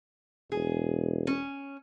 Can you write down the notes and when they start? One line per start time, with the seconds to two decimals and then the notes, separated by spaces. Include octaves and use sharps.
0.52 E1 G#4
1.27 C#4